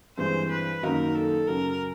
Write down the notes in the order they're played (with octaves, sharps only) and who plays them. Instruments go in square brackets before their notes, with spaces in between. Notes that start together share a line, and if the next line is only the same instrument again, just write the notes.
[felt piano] G2 E3 G#3 C4 [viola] C5
[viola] B4
[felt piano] F#2 D#3 F#3 A#3 D#4 [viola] A#4
[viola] A4
[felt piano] F#2 C#3 F#3 [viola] A#4